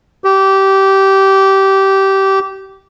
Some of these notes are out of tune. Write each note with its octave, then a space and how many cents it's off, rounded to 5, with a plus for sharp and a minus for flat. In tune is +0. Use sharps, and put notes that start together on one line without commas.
G4 -20